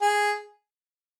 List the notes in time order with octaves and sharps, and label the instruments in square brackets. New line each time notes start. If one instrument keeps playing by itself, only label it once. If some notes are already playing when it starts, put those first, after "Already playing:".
[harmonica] G#4